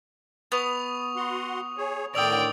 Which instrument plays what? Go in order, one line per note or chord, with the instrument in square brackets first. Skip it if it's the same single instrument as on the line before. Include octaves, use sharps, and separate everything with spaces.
[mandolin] B3 [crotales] C#6 D#6 F7
[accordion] F#4 F#5 C6
G#4 C#5
[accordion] A2 D3 D#3 [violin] D5 G5 [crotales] D#6 E6 F7